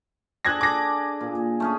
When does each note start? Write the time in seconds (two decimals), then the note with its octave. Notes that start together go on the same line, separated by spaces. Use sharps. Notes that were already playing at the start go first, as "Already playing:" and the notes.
0.45 D4 G#4 A4 F#6 G#6 A#6
0.61 G#4 D6 A#6
1.21 A#2
1.60 A3 C#4 G#4